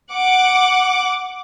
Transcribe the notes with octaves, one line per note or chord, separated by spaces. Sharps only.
F#5 D6